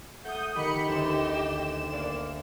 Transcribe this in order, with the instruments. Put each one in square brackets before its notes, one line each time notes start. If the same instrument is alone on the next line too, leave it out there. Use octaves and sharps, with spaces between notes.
[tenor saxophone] A3 [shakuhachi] F#5 [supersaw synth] D#6 G6
[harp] D#3 B3 [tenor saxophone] G4 [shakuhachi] D#5 [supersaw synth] B5 C#7
[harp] D2 C#4 D6 [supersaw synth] E7
[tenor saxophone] A#3 [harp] B3 D5 E5